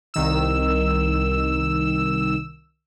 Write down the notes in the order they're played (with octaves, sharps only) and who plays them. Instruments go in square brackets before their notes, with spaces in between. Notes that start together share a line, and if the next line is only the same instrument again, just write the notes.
[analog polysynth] C2 D#3 E6